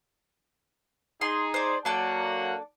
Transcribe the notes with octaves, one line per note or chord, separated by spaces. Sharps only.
D#4 G#4 C6
C5 D5
F#3 A#3 D4 A4 D5 F#5